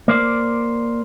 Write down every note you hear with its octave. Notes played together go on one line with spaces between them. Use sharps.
A#3 C5 D5